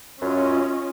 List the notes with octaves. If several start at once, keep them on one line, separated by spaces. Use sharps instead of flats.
F#2 C#4 F4 D#5